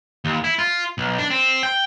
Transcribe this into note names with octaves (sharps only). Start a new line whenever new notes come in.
D#2
E4
F4
B1
D4
C4
G5